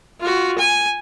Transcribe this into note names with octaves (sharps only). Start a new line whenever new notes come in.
F4 F#4
G#5